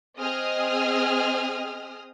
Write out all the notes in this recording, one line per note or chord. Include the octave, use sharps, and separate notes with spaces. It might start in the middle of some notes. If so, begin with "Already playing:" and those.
C4 G#4 D#5 D#6 F6